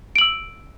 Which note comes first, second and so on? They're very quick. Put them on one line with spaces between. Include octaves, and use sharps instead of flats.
D7 F#7 E6